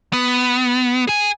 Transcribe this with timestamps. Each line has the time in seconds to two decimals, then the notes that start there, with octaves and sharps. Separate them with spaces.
0.13 B3
1.07 G#4 G#5